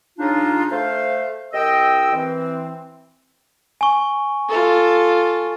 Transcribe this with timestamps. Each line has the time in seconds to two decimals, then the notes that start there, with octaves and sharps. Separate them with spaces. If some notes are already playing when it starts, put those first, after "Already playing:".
0.19 C#3 D4 D#4 F4
0.72 A3 C5 F5
1.53 C2 D#5 G5 E6
2.14 E3 C4
3.81 G#5 C#6
4.49 F4 A4